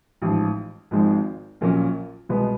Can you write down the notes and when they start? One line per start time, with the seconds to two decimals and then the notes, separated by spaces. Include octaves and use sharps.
0.22 A1 G#2 F3
0.91 G#1 G#2 F3 G#3 C4
1.61 A#1 A#2 F#3 A#3 C#4
2.29 C2 B2 G#3 B3